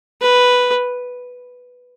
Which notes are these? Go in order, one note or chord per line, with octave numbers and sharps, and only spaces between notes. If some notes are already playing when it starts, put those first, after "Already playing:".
B4